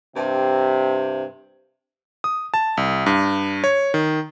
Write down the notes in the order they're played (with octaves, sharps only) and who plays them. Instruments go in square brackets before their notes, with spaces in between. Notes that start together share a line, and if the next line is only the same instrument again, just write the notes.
[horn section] G2 C3
[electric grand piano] D#6
A5
C2
G2
C#5
D#3